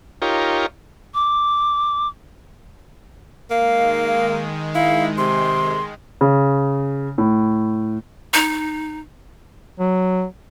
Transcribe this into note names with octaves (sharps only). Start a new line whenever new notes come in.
D#4 F4 G4 A#4 C#5
D6
D#3 G#3 A#3 F5
E4 F5
C3 C6
C#3
A2
D#4
F#3